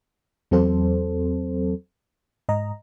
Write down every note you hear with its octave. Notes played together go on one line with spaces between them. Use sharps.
E2 F#3 C4 A4 C5
G#2 D#5 A#5